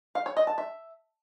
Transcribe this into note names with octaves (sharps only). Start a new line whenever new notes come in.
F5
C#5
D#5
A5
E5